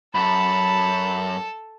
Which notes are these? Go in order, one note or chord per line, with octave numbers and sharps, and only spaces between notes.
F#2 A4 A5 B5